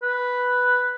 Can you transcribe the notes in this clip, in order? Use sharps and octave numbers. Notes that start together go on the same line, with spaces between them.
B4